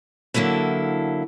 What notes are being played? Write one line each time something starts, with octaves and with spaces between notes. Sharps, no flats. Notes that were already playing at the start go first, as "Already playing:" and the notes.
D3 F#3 A#3 E4 A4